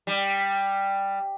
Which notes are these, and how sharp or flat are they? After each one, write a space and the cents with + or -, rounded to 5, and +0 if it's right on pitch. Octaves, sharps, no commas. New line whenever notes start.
G3 +5